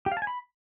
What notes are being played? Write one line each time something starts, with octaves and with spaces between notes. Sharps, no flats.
G4
F5
A5
G#5
B5